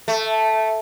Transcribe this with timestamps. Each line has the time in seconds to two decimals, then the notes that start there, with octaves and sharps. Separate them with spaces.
0.08 A3